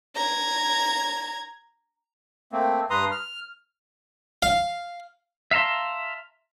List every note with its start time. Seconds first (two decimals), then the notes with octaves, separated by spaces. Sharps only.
0.15 A#5 G#6
2.52 A3 A#3 C4
2.90 G2 B4 A#5 C6 D#6
3.12 F6
4.43 F5
5.51 E5 F5 A5 A#5 C6